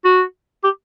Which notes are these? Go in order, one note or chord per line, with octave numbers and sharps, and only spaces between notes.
F#4
G4